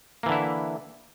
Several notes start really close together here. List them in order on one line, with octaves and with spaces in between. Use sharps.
A#3 E3 D3 E4